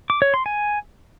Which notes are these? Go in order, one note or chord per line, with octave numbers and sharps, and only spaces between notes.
D6
C#5
C6
G#5